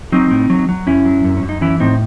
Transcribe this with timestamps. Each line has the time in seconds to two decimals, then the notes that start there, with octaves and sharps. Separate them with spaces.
0.12 F#3 C4 D#4
0.31 A2
0.50 F#3
0.69 F#3
0.86 F#2 C#4 E4
1.06 F#3
1.25 F#2
1.37 C#4
1.43 F#2
1.49 D#4
1.61 E3 C#4 E4
1.80 A2 C4 D#4